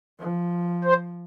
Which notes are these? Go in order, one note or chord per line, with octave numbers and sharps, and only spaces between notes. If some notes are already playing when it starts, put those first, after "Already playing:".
F3
C5